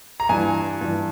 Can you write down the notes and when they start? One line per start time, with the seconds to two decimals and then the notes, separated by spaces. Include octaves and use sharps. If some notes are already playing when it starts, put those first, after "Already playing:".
0.20 A#5
0.29 G2 E3 G#5
0.81 G2 E3